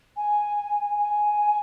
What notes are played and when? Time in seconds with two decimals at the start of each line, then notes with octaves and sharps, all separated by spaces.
0.16 G#5
0.98 G#5